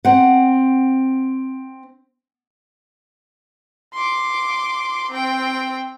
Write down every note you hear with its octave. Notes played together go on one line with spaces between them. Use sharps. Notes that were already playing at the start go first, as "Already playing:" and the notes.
C4 F#5
C6 D6
C4 G5